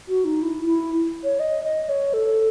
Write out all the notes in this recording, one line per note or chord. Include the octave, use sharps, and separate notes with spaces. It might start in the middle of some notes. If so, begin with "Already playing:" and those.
F#4
D#4
E4
E4
C#5
D#5
D#5
C#5
A4